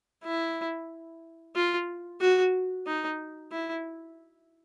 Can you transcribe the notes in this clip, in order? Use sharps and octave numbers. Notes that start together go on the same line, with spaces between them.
E4
F4
F#4
D#4
E4